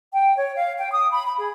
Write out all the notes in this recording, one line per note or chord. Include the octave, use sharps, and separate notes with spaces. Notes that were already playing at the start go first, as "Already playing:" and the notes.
G5
C#5
F5
G5
D#6
B5
B5
G#4